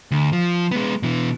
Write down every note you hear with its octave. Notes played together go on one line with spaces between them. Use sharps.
D2
F3
G#3 B3
B2 E3